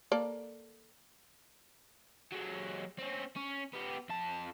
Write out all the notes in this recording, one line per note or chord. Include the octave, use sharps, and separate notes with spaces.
A#3 A4 D5
F#3 G#3
C4 C#4
C#4
B3 G4
F2 A5